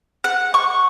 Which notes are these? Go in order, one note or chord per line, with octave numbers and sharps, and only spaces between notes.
F#5
C#6